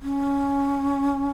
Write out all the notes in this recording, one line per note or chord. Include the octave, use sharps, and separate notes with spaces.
C#4